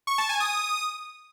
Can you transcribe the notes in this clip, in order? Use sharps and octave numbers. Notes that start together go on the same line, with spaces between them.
C#6
A5
G#5
D#6